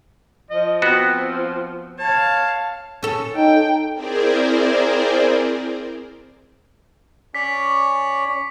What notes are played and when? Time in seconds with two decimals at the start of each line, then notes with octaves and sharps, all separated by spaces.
0.50 F3 D#5
0.82 B3 C4 F#4
1.98 C#5 F5 A5
3.03 C#4 A4
3.36 D#4 G5
3.94 C4 E4 G#4 A#4 C5 D5
7.35 C#4 C#5 D5 B6